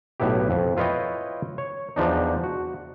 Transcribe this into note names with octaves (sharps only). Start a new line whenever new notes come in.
B1 A2 B3 E4 G4
F2
E4 F4 B4 C#5 D#5 G5
C#5
E2 F3 D4 D#4
F#4